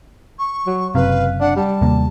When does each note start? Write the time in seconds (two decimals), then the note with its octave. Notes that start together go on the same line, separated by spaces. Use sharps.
0.38 C#6
0.66 F#3
0.95 F#1 F#2 C3 B4 F5
1.40 D4 F#5
1.56 G3 A5
1.82 D#2 C3 A#3